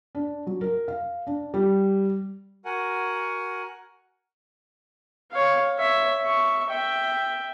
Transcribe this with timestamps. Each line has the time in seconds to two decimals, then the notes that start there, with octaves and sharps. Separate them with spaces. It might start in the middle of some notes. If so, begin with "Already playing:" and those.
0.15 D4
0.47 F#3
0.61 A#4
0.88 F5
1.27 D4
1.54 G3
2.65 F#4 A#4 F#5 G#5
5.32 C#5 F5
5.77 C#5 E5
6.21 E5 C#6
6.69 E5 G5